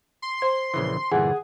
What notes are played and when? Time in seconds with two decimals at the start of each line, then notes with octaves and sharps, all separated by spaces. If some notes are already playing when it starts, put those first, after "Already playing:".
0.22 C6
0.42 C5
0.74 A#1 C#3 E3
1.12 G1 A#2 E3 G#4 F#5